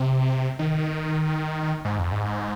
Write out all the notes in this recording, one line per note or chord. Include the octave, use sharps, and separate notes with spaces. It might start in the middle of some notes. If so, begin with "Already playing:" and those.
Already playing: C3
D#3
G#2
F2
G#2